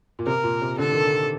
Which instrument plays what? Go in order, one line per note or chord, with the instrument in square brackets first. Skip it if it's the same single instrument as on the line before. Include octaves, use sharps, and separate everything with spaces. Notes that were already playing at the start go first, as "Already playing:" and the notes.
[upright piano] A#2
[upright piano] C3 [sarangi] A#4
[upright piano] A#2
C3
[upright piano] D3 [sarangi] A4
[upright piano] D#3
D3